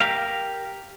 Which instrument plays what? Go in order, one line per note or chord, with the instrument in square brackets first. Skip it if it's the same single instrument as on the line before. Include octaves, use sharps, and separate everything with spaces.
[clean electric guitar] G4 A#4 F5